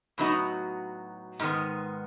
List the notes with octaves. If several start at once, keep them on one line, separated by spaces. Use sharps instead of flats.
A2 F#3 B3 D#4 F#4
G#2 D#3 G#3 B3